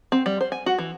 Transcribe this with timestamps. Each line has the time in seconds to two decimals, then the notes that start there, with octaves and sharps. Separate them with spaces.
0.12 C4
0.26 G3
0.41 C5
0.52 G#5
0.66 F#4
0.78 E3